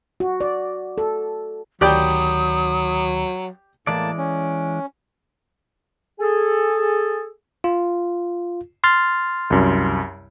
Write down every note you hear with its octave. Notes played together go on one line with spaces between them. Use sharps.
F#4
D5
A4
D2 D#3 F#3 G4 D5 G5 B5 D#6
A2 E3 G#3 A#3 D5 A5
C#4
G#4 A4
F4
C6 F6 A6
C2 F#2